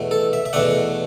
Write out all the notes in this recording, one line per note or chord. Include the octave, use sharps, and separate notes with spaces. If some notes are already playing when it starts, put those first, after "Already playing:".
Already playing: E2 B2 A3
A4
E5
E5
E2 B2 A3 D4 F#5